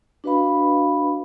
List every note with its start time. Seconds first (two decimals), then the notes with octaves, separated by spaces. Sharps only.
0.24 D4 F#4 B4 D#5 F5 B5